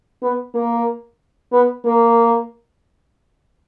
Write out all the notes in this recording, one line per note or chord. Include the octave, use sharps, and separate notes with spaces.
B3
A#3
B3
A#3